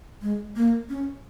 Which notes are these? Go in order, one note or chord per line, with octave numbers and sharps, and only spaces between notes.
G#3
A#3
C#4